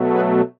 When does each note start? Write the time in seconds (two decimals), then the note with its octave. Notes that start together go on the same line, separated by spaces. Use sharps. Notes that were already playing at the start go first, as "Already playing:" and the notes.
Already playing: B2 F#3 A3
0.10 G#4 B4